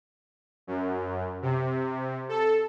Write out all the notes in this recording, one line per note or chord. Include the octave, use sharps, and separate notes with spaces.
F#2
C3
A4